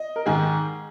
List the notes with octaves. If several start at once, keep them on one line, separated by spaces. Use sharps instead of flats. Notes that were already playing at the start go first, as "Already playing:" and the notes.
Already playing: D#5
A#4
G#2 D#3 G#3 G#4